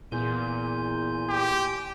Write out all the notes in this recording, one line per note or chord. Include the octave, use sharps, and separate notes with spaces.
E2 A#2 G#5 C6 G6
G4